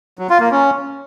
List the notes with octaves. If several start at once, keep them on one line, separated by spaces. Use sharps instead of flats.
F#3
F4
A#3
C#4